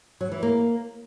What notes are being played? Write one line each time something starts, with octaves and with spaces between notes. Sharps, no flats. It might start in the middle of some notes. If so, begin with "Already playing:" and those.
F#3
E3
A#3